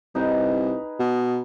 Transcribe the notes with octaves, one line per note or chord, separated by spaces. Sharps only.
C2 D#4 G#4 B4
B2